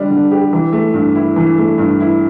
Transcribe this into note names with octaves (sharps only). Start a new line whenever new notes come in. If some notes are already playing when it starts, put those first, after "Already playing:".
Already playing: D3 G3 D4
D3
G4
E3
A3
G2
E4
E3
A3
G2
E4